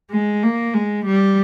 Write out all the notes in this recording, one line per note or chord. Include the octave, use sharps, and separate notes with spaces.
G#3
A#3
G#3
G3